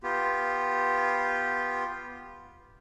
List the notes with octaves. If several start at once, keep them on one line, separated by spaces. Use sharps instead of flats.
B3 F4 G4